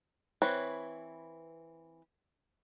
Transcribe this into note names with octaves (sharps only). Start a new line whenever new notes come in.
E3 C4 B4 C#5